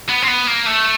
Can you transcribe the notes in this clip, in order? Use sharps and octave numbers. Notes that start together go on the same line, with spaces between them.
B3
C4
B3
A#3
A3